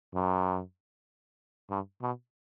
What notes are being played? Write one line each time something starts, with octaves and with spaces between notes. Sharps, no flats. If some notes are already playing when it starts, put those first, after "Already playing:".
F#2
G2
B2